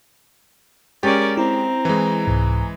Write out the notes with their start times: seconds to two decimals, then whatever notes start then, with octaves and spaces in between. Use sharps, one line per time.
1.03 G#3 C#4 G4 A#4 D5 A6
1.37 C4 E4 A#5
1.85 E3 G#3
2.27 C2 G#2